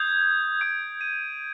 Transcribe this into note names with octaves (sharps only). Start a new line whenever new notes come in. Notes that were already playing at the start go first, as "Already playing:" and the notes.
Already playing: D#6 G6 G#6
D#6 G6 D7
D#7